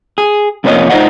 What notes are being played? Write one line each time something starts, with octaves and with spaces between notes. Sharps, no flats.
G#4
F2 C3 F3 A#3 C#4 D#5
D#4 F4 A4 C5 D#5 F#5